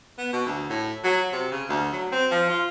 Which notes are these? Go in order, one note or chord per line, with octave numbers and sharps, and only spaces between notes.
B3
B2
D2
A2
F#3
C3
C#3
D2
F#3
C4
F3
F4